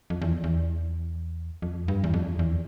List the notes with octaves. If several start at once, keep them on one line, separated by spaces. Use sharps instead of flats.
F2
E2
E2
F2
G2
E2
F2
E2